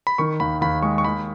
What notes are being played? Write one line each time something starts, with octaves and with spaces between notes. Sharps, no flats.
B5
D#3 C#6
D#2 B5
D#2 B5
G#3 C#6
C#6
D#2 B5